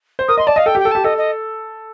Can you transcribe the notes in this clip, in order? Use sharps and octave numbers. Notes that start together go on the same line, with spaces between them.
C5
A#4 D#6
D#5 C6
D5 A5
D#5 F5
A4 G5
G4
G5
A4
G4 A5
A4 D#5
D#5